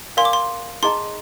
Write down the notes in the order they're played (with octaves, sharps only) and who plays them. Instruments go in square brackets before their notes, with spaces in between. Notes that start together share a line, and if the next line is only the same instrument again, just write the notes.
[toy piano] A#4 D5 F5 G#5 [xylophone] C6
[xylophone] D6
C6
[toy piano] D#4 G#4 D#5 A#5 [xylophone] C6